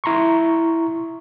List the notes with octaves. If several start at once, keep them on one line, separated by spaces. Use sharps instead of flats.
E4 A#5 C6 C#6